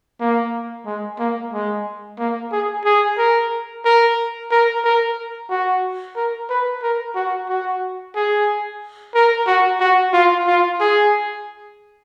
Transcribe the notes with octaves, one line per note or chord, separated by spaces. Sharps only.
A#3
G#3
A#3
G#3
A#3
G#4
G#4
A#4
A#4
A#4
A#4
F#4
A#4
B4
A#4
F#4
F#4
G#4
A#4
F#4
F#4
F4
F4
G#4